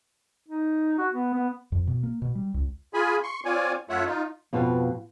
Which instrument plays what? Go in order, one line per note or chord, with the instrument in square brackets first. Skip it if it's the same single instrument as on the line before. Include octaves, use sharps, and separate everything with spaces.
[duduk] D#4
F#4
B3
B3
[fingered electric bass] F2
B2
A#3
B2
G3
C#2
[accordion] F4 G#4 G#5 B5
C6 C#6
C4 F4 C#5 D5 G#5
F#2 A3 F4 C#5 E5 F#5
D#4 F4
[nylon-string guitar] F2 B2 F4 B4